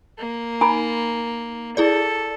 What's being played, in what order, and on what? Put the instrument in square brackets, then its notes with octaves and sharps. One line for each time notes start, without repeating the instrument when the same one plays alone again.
[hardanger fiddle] A#3
[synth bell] D#4 [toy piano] G#5 A#5 B5
[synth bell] E4 G#4 D5 [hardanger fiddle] A4